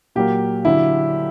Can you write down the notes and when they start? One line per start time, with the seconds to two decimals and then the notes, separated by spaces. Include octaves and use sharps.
0.15 A#2 F#3 A#3 G4
0.65 D3 F#3 E4